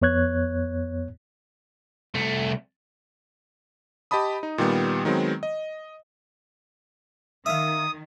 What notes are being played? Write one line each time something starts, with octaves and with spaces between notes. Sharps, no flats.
F2 B3 C#5 F#6 G#6
C2 A3
G4 D#5 A5 B5 D#6
D#4
A#2 D#3 G3 B3
D#3 F#3 G#3 B3 C4
D#5
D#3 E5 F5 D#6